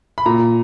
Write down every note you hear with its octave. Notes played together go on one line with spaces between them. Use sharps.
B5
A#2 A#5